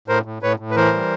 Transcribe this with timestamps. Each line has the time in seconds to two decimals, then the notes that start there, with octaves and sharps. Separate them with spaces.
0.08 A2 A#4 C5
0.25 A2
0.42 A2 B4 C#5
0.59 A2
0.71 B4
0.76 E3 A#4 C5
0.93 G3